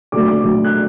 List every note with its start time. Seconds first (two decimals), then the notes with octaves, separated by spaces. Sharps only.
0.12 D3 F#3 A3 D6
0.28 D6
0.43 D3 F#3 A3
0.64 F#6